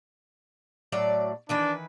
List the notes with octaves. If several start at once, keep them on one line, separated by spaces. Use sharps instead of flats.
A2 F#3 D5
D#3 E3 D4 B4